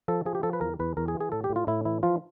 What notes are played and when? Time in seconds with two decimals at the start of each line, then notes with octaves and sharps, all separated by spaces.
0.08 F3 A4
0.25 F3 G#4
0.35 G4
0.43 F3 A4
0.53 B4
0.61 E2 A#4
0.79 E2 B4
0.97 E2 A#4
1.08 G#4
1.14 E3
1.20 G#4
1.32 A2 A4
1.44 G4
1.50 A2
1.56 F4
1.67 A2 E4
1.85 E3 E4
2.03 F3 F4